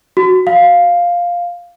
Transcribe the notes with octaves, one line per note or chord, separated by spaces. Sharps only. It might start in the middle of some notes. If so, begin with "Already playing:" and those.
F#4
F5